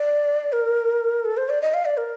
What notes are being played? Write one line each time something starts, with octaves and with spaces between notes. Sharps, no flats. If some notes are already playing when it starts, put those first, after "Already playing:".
Already playing: D5
A#4
A4
C5
D5
D#5
F5
D5
A#4